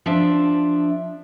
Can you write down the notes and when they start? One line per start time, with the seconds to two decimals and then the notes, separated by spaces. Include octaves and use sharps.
0.06 F3 D4 E5